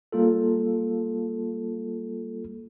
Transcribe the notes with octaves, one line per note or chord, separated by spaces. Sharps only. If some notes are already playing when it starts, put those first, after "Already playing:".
G3 A#3 F4 A4